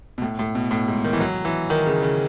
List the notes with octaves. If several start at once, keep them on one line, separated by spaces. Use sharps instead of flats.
B2
A2
A2
B2
A2
G#2
D#3
E3
F#3
E3
D#3
C#3
C#3